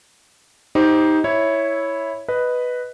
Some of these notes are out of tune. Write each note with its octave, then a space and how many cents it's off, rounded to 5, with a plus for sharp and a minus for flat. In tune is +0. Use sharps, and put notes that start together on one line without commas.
D#4 +15 G4 +0 C5 -5
E4 -5 C#5 +0
B4 +0 D#5 +0